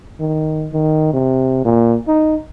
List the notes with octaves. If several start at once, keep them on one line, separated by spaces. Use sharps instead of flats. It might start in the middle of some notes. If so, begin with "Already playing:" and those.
D#3
D#3
C3
A#2
D#4